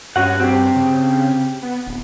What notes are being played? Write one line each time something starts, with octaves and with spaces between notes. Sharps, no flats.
G2 C#4 F#4 F#5
C4 G4
C#3
B3
D1